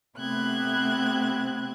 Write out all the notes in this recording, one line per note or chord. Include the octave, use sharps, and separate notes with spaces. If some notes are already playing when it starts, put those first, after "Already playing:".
C3 A3 B3 C4 F#6 G#6